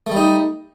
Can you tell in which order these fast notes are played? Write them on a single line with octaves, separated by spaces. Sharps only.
A3 G3 D#4